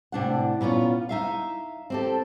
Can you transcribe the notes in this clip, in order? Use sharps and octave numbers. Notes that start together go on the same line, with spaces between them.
A2 C3 D4 F#5
A#2 B3 C#4 F4
D#4 E5 F5
C4 G4 A4